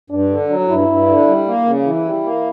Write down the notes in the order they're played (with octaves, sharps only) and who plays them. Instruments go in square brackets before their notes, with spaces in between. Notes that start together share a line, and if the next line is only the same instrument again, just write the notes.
[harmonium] G2 [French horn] D4
[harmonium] D3
F#3
[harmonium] G2 [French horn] E4
[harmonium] G2
D3
G3
A#3
C#3
[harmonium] E3 [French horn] E4
[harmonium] G3
A#3